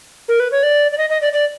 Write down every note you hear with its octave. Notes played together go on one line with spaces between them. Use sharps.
A#4
B4
C#5
D5
D5
D#5
D#5
D5
D5